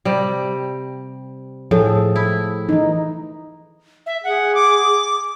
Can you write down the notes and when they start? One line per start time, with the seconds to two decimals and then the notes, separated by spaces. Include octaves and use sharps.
0.05 C3 G3
1.71 A2 F3 G#4 A4
2.16 E4
2.69 E3 D#4
4.06 E5
4.24 G#4 F#5
4.55 D6